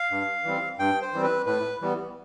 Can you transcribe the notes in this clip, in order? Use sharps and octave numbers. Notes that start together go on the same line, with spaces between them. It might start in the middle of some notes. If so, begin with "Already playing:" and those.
Already playing: F5
G2
E3 G3 C4
G2 G5
C5
E3 G3 C4
B4
A2 B4
E3 G3 B3